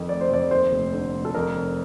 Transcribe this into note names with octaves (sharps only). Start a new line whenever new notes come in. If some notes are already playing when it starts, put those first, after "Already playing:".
Already playing: F2 D#3
A3 D5
C5
F2 D5
D#2 C5
F1
D3
F1
A4
F2 A#4
F1